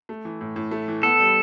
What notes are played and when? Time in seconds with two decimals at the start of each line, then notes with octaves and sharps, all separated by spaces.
0.09 A3
0.25 E3
0.41 A2
0.56 A2
0.71 A3
0.88 E3
1.03 B3 A4
1.19 G3